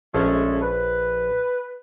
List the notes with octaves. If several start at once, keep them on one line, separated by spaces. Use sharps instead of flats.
A#1 G#3 A3 C#4
B4